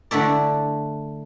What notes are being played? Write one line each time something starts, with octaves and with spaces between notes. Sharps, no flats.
D3 A3 E4 D5